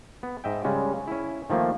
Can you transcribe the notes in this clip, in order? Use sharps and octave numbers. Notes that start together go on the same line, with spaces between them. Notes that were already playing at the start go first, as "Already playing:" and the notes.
B3
G#2 D#5 E5 G5
C#3 G3 G#3 C#4
C#4 E4
D#3 F3 A3 A#3